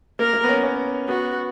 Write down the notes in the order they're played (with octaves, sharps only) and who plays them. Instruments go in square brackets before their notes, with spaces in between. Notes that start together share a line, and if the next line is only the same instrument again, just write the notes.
[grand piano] A#3 [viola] A#4
[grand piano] A#3
B3
C#4
C#4
[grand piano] B3 [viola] F#4